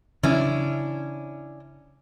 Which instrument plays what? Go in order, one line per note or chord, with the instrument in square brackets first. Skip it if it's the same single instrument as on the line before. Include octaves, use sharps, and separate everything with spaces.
[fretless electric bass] C#3 E3 F#3 [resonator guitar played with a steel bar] C#4 D4 E4